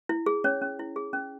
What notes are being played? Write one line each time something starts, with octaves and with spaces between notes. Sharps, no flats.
E4
G#4
C#4 C#5
C#4
E4
G#4
C#4